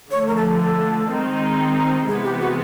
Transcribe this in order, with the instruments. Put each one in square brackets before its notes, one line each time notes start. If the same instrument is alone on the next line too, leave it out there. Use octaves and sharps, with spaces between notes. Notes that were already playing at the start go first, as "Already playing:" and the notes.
[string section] D3 F3 A3 [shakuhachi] C#5
[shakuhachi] A#4
A4
A4
[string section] D#3 G#3 C4 D#4
[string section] C3 E3 G#3 B3 [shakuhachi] G#4
[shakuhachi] G4
F#4